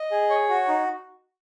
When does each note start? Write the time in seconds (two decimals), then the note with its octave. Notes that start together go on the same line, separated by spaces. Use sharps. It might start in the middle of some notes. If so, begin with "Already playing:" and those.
Already playing: D#5
0.11 G#4
0.30 C#5
0.49 F#4
0.68 D#4